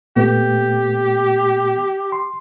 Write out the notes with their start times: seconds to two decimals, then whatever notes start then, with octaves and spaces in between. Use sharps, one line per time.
0.16 A#2 A3 B3 G4
2.12 C6